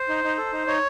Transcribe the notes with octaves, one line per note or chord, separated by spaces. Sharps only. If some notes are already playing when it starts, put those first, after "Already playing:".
Already playing: C5
D#4
D#4
A4
D#4
D#4 C#5